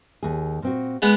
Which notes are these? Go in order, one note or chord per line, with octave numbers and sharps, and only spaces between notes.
D#2 G#4
A#2 C4 F#4
G#3 B3